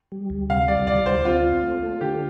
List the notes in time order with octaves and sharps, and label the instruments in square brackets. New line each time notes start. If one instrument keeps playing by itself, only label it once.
[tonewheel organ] G3
D2
[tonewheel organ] C3 [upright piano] F5
[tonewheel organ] G3 [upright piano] D5
[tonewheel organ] D2 [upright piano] D5
[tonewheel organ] D2 [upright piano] C5
[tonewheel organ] C4 [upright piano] F4
[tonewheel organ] C4
A3
A3
[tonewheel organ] D3 [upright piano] G4